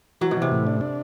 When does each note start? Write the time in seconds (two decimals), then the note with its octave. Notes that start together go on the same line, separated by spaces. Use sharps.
0.21 E3 F#3
0.31 B2
0.37 C3 E3
0.52 A2
0.67 D4
0.81 D4